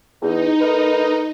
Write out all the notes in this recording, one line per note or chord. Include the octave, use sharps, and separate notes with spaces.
E2 D#4
A3 A#4 B4